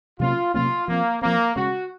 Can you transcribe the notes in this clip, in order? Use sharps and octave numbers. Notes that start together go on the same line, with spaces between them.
C3 F#3 A#3 C#4 F4
C3 F#3 A#3 C#4 F4
F3 A#3 C4
F3 A#3 C4
C#3 G#3 C#4 F#4